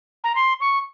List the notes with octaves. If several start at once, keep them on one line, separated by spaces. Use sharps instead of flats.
A#5
C6
C#6